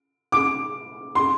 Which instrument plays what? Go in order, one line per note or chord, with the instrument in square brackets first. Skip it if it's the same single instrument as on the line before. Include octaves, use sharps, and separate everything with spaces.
[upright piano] D6
C6